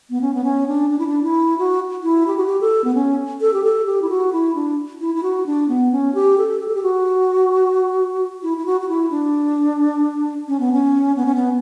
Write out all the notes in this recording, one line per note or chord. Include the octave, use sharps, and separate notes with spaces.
B3
C#4
B3
C#4
D4
D4
E4
D4
E4
F#4
E4
G4
F#4
G4
A4
B3
C#4
A4
G4
A4
G4
E4
F#4
E4
D4
E4
E4
F#4
D4
B3
C#4
G4
A4
G4
A4
G4
F#4
E4
E4
F#4
F#4
E4
D4
C#4
B3
C#4
B3
C#4
B3